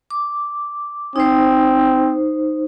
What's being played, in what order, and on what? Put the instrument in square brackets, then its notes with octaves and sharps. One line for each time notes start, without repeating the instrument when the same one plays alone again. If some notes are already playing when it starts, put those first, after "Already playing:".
[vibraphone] D6
[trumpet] C4 [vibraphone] D#4 C5